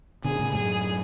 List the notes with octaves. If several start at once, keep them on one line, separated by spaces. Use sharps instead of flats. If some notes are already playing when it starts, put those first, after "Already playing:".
B2 D3 G#4
A2 C#3
F#2 A2 G#4